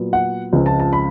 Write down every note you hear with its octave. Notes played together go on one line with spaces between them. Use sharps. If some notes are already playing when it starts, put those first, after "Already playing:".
Already playing: A#2 F#3 B3
F#5
C#2 C#3 F3 G#3 C4
A5
A5
B5